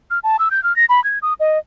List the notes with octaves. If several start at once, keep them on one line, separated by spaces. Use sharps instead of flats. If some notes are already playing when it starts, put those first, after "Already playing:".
F6
A5
E6
G6
F6
A#6
B5
G#6
D#6
D#5